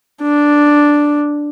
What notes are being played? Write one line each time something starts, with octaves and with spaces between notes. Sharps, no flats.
D4